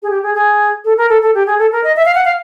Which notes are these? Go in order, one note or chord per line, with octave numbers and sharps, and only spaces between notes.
G#4
G4
G#4
G#4
A4
A#4
A4
A4
G4
G#4
A4
A#4
D#5
E5
F5
F#5
F5